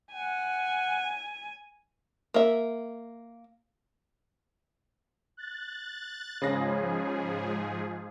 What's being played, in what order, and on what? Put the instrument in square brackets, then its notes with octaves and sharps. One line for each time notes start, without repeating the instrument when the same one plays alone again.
[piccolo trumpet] F#5 [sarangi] G#5
[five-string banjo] A#3 E5
[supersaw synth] F#6 A6
[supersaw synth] G#2 F3 G#4 [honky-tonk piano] C#3 A#6